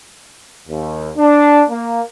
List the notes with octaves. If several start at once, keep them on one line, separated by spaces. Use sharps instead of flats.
D#2
D4
A#3